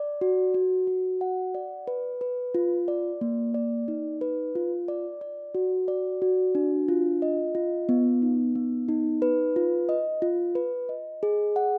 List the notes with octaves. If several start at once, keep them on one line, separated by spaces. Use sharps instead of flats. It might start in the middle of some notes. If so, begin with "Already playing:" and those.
Already playing: D5
F#4
F#4
F#4
F#5
D5
B4
B4
F4
D5
A#3
D5
D#4
B4
F4
D5
D5
F#4
D5
F#4
D4
F4
D#5
F4
B3
D#4
B3
D#4
B4
F4
D#5
F4
B4
D#5
G#4
F#5